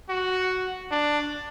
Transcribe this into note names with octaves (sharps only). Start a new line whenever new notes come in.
F#4
D4